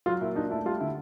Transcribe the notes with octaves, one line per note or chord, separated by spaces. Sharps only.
F#3 F4
A#2 E4
D4 D#4
A3 E4
G3 F4
D3 E4